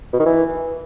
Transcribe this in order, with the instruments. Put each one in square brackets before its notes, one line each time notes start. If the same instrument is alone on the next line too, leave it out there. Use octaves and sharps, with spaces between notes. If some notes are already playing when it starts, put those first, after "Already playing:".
[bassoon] B2
D#3
E3